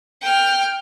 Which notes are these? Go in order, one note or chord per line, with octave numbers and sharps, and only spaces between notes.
G5 F6